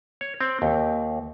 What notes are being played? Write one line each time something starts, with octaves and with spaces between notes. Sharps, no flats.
C#5
C4
D#2